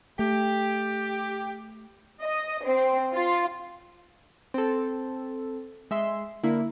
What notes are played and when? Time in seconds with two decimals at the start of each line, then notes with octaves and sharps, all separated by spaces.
0.19 A3 G4
2.19 D#5
2.63 C4
3.13 F4
4.54 C4 A4
5.91 G#3 E5 C6
6.44 D3 A#3 E4